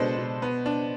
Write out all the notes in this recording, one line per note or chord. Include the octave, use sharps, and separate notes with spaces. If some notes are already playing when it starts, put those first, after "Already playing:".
Already playing: B2 G#3 D4 A4 B4 C5
B2
B3
D4